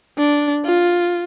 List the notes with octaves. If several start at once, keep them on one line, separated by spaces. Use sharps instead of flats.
D4
F4